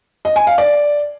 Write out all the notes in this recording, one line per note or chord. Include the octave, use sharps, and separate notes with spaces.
D#5
G#5
F5
D5